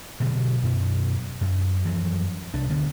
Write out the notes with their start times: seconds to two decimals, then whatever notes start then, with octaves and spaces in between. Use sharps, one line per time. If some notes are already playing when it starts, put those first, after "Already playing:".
0.20 B2 D3 F#3
0.63 F#2 B2
1.41 F#2
1.85 F#2 E3 F3
2.54 C2 D4
2.69 D2 D3 B3